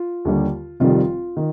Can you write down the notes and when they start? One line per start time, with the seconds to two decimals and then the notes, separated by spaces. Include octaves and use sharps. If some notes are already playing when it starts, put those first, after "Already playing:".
Already playing: F4
0.25 D#2 D3 G3
0.80 F1 F2 D#3 G3 F4
1.37 D#3